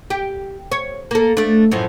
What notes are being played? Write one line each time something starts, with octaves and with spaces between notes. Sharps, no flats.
G4
C#5
A#3 A4
A3 D4
F#2 A2 F3